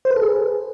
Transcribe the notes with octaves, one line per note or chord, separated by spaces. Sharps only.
C5
B4
A4
G#4